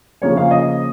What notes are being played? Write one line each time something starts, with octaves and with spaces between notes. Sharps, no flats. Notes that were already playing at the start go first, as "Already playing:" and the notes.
C#3 F3 A#3 C#4 C#5
F5
D#5